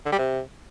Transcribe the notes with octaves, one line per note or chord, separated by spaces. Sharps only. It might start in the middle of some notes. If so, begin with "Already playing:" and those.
D3
G3
C3